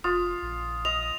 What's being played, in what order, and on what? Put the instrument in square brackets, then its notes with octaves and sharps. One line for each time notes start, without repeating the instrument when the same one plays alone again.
[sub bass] F1 [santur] F4 [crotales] D#6
[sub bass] A#1
[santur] D#5 [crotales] F7